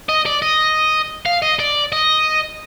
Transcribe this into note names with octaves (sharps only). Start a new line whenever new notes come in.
D#5
D5
D#5
F5
D#5
D5
D#5